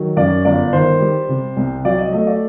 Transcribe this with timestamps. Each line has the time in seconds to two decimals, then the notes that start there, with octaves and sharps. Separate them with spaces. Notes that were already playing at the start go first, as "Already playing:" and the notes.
Already playing: D#3 F#3
0.17 F#2 D5
0.45 G1 D5
0.73 D#3 C5
1.00 G3
1.29 C3
1.56 C2
1.85 F#3 D5
1.99 D#5
2.13 A3 D#5
2.27 D5